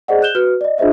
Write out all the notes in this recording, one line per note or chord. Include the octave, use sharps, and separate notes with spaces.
G#4 C5 D5 D#5 F#5
F#6 G6 E7 G7
F#4 B4 F6
D5 D#5
D4 F4 G#4 C5 D#5 E5